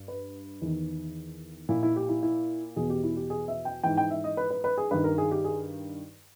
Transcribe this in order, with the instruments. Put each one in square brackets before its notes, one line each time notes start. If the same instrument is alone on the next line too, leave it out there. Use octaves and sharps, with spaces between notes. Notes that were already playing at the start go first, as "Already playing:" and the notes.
Already playing: [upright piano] G2
B4
E2 D#3
A#2 E4
E4
G4
E4
E4
E2 B2 G#4
G4
E4
G4
G#4
E5
G5
G#2 E3 G5
G5
E5
D#5
B4
B4
B4
G#4
G2 D#3 B4
A#4
G#4
G4
G#4